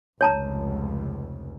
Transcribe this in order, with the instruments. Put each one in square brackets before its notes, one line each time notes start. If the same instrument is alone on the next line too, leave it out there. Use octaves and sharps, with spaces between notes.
[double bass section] F1 C#2 [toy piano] C#5 A5 A#5